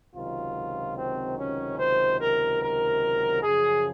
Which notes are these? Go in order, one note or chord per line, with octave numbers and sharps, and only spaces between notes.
C#2 C3 D#3 F#3 F4
C4
C#4
C5
A#4
A#4
F#2 C#3 F3 G#4